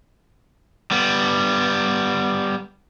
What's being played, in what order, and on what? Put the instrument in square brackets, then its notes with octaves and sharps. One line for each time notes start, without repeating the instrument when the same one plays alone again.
[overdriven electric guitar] G3 B3